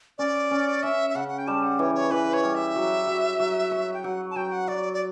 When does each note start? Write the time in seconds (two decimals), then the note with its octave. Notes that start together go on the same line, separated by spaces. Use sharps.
0.18 C#4 D5
0.51 C#4
0.83 C#4 E5
1.10 E5
1.15 C#3 F#5
1.29 F#5
1.38 G5
1.47 G3 A5
1.63 F#5
1.79 E3 C#5
1.95 C#5
2.11 E3 B4
2.33 C#5
2.43 G3
2.55 E5
2.76 F#3
3.07 F#3
3.40 F#3
3.72 C#5
3.94 G5
4.04 F#3 F#5
4.30 A5
4.36 F#3 G5
4.52 F#5
4.68 F#3 D5
4.93 D5